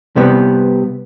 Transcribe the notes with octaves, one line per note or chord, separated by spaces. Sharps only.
C3 G3 B3